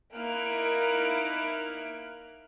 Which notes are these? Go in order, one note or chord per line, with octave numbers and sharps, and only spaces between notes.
A#3 D#4 E4 F6 F#6 D7